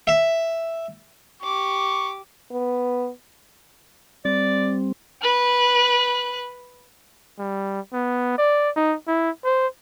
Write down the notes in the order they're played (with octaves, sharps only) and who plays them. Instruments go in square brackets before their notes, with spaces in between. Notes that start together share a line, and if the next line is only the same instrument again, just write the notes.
[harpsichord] E5
[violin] G4 D6 [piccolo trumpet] C#6
[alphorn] B3
[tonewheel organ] G3 C4 [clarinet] D5
[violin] B4 F#6
[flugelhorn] G3
B3
D5
D#4
E4
C5